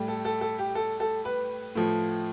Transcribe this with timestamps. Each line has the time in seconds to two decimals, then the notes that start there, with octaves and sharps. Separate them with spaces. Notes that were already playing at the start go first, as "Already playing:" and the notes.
Already playing: A2 G3
0.08 A4
0.25 A4
0.41 A4
0.59 G4
0.75 A4
1.00 A4
1.25 B4
1.75 A2 F3